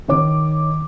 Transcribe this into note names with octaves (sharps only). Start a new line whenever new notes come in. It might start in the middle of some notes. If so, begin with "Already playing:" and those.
D#3 C#5 D6